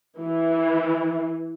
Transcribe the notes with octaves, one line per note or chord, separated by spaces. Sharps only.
E3